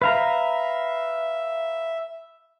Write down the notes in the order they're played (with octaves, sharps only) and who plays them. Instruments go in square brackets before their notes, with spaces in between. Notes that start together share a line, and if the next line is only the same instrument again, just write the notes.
[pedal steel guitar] B4 F5 A#5 [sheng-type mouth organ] E5